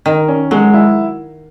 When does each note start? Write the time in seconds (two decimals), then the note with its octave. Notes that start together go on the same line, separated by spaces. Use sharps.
0.06 D#3 A#4
0.28 C#4
0.51 F#3 G#3
0.74 E4